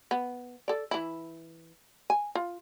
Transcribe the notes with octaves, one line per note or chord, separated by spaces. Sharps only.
B3
A4 D5
E3 E4
G#5
F4